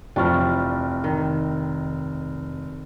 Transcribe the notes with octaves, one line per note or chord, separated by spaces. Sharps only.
F1 E3 F3 D4 G5 C#6 F6
D#3